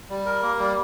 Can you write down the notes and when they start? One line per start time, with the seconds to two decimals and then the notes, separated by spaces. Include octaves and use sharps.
0.09 G3
0.26 A#4
0.42 A#3
0.59 G3